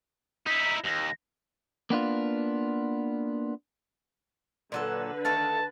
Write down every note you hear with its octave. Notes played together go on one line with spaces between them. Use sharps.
D#4 E4 B6
D#2 A#6
A#3 B3 D4 F4
A#2 D3 F#3 A4 B4
D#3 A3 F5 A5 A6